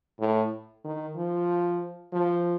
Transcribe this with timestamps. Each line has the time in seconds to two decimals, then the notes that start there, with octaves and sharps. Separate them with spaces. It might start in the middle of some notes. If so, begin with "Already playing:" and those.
0.20 A2
0.85 D#3
1.16 F3
2.13 F3